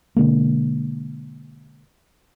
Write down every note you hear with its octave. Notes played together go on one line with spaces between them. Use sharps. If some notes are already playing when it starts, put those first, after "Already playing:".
B2 D3 G#3 A#3